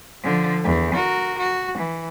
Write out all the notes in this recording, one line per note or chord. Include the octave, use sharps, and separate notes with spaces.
D3 F3
E2
F#4 A#4
F#4
E3